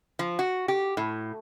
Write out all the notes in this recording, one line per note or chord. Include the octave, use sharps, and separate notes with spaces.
F3
F#4
G4
A2